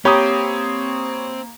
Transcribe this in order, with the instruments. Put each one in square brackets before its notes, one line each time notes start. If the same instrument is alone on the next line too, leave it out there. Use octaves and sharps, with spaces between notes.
[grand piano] A#3 A#5 B5 [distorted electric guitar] C4 [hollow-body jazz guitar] G4 [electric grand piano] C#5 D#6